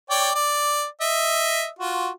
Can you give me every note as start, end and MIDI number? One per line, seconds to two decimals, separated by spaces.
0.10 0.30 73
0.10 0.30 74
0.10 0.30 79
0.35 0.86 74
1.01 1.68 75
1.01 1.68 76
1.79 2.09 65
1.79 2.09 66